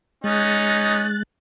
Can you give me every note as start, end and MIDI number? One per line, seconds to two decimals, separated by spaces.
0.24 1.23 56
0.24 1.05 61
0.24 1.05 63
0.24 1.23 90
0.24 1.23 93